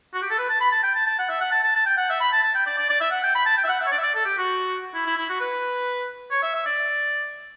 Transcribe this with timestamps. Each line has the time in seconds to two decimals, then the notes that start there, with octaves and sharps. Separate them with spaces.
0.14 F#4
0.22 G4
0.30 A4
0.38 B4
0.49 A5
0.60 B5
0.72 A5
0.83 G5
0.95 A5
1.06 A5
1.18 F#5
1.29 E5
1.40 F#5
1.51 A5
1.63 A5
1.75 A5
1.86 G5
1.97 F#5
2.10 E5
2.20 B5
2.32 A5
2.43 A5
2.55 G5
2.66 D5
2.78 D5
2.90 D5
3.01 E5
3.11 F#5
3.23 G5
3.35 B5
3.45 A5
3.57 G5
3.64 E5
3.68 F#5
3.81 E5
3.86 C#5
3.92 D5
3.98 E5
4.03 D5
4.15 A4
4.25 G4
4.38 F#4
4.94 E4
5.06 E4
5.17 E4
5.29 F#4
5.40 B4
6.31 C#5
6.43 E5
6.54 E5
6.66 D5